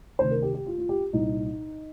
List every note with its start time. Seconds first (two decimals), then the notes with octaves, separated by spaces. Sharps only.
0.19 D2 C3 D#3 C5
0.31 A#4
0.42 G4
0.55 G4
0.66 F4
0.79 F4
0.89 G4
1.13 C2 A#2 D#4